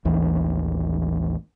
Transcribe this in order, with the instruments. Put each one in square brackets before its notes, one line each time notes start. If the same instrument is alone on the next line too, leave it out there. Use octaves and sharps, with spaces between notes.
[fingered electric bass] A1 D#2 E3